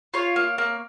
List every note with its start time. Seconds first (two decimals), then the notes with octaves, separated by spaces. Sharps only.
0.14 F4 C#5
0.36 A#3
0.58 A#3